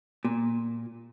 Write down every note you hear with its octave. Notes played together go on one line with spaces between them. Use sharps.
A#2